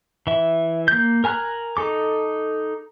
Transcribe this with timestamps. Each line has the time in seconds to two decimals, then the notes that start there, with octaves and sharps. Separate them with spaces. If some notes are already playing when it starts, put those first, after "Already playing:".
0.27 E3 E5
0.88 A#3 G6
1.24 A#4 G#5 A#5 F6 F#6
1.77 D#4 A4 D6